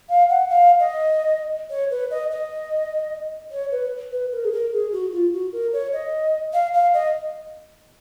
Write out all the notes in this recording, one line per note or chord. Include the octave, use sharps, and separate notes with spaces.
F5
F#5
F5
D#5
C#5
B4
D#5
D#5
C#5
B4
B4
A#4
G#4
A#4
G#4
F#4
F4
F#4
A#4
C#5
D#5
F5
F5
D#5